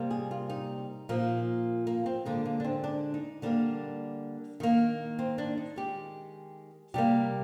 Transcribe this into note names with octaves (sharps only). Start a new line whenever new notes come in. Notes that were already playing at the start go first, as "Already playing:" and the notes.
Already playing: C3 G3 A#3
G#4
F4
D#4
A#2 F3 A#3
A#3
C4
D3 G#3 A#3
A#3
D4
C4
D4
D#4
D3 G3 A#3 D4
D#3 A#3
C4
D4
D#4
D#3 G#3 G4
C3 G3 A#3 G4